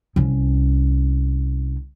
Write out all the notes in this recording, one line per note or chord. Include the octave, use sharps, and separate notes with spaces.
C2 C#4